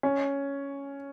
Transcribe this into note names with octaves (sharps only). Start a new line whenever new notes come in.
C#4